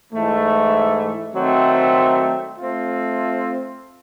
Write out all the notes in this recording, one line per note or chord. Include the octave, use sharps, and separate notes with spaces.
G#2 E3 A3
D#3 F#3 A3 C4
A3 C4 F4